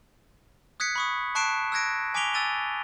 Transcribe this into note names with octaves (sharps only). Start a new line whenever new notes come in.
D#6 F#6 G#6 B6 C#7
B5 C#6 D#6
A5 C#6 F#6 C7 D7 E7
E6 F#6 G#6 A#6 D7
G#5 D6 B6 D7 F7 G7
G#5 E6 A6 D#7 G7